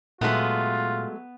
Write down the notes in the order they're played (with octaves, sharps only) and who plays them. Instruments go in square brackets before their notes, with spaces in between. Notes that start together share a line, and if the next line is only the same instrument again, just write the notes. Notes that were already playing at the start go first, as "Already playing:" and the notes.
[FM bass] A#2 [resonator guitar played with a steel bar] F#3 G#3 A3 [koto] B3 B4 [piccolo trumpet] F4